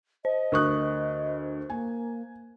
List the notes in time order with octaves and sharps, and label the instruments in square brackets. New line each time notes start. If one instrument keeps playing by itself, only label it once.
[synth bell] C5 [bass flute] D#5
[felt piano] D2 F#6 [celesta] A#4 C#6 D#6
[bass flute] A#3 [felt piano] G#5